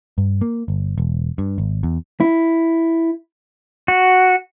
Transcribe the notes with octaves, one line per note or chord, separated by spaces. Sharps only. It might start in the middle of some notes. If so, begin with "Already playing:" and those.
G2
A#3
G1
E1
G2
G#1
E2
E4
F#4